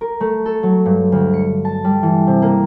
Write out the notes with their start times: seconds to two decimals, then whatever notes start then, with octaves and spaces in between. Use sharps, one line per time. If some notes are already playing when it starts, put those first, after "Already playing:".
0.01 A#4
0.20 A3
0.46 A4
0.63 F#3
0.86 G2
1.12 D2
1.34 C#7
1.65 A5
1.84 G3
2.03 E3
2.27 C3
2.42 A#3